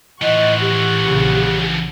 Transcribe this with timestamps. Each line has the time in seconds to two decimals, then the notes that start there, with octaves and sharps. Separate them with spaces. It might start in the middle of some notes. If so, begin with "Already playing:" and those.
0.22 A2 E3 F3 D#5 F#5 C#6
0.61 G4
1.02 A#1 C#3